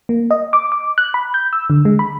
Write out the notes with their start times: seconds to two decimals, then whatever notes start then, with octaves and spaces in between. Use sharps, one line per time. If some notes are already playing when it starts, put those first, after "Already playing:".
0.09 A#3
0.31 D#5
0.53 D6
0.72 D6
0.98 F#6
1.14 B5
1.34 G6
1.53 E6
1.70 D3
1.85 G#3
1.99 B5